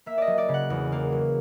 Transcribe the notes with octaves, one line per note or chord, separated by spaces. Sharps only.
A#3 E5
D5 D#5
F#3
D5
C#3
F#5
E2
A#3
F#3